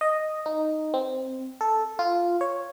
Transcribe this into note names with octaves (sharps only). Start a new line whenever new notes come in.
D#5
D#4
C4
A4
F4
C#5